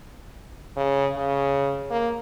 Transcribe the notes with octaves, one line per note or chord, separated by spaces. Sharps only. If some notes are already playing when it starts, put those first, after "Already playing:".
C#3
C#3
A#3